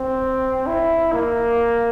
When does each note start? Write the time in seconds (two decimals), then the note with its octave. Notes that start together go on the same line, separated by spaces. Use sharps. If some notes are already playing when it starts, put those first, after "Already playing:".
Already playing: C4
0.67 E4
1.13 A#3